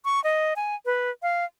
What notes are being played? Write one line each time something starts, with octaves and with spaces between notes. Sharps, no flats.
C#6
D#5
G#5
B4
F5